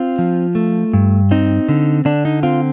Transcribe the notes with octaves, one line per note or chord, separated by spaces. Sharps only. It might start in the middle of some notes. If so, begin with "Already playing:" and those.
Already playing: C4 F4
F3
A3
G2
C4 D#4
D3
D3 D4
D#4
C4 F4